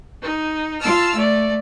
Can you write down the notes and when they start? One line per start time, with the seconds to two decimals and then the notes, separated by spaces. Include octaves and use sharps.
0.22 D#4
0.80 F4 A5 E6 F6
1.15 A3 D5